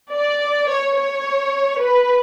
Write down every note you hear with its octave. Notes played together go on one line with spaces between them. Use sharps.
D5
C#5
C#5
B4